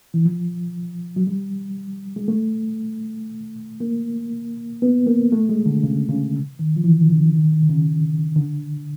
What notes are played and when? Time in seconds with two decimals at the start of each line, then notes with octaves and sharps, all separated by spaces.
0.14 E3
0.25 F3
1.16 F#3
1.27 G3
2.16 G#3
2.28 A3
3.80 A#3
4.82 B3
5.07 A#3
5.32 A3
5.49 G#3
5.66 D3
5.83 C#3
6.09 C#3
6.59 D#3
6.76 F3
6.84 E3
7.01 D#3
7.10 C#3
7.18 D3
7.35 D#3
7.52 D#3
7.63 D3
7.70 C#3
8.36 D3